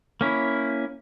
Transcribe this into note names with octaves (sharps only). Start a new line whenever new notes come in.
A#3 C#4 E4